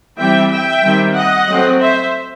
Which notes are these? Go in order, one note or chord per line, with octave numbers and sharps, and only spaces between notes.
E3 G3 C4 E5 G5
E5 G5
D#3 G3 C4
D#5 F#5
F#3 A3 C4
C5 E5